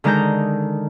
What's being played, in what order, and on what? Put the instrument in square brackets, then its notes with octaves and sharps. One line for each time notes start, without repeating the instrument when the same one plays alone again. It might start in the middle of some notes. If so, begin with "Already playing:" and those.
[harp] D3 D#3 G#3 A5 A#5 G6